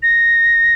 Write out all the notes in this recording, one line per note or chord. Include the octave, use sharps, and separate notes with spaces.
A#6